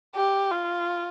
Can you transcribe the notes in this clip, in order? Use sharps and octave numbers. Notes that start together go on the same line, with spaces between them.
G4
F4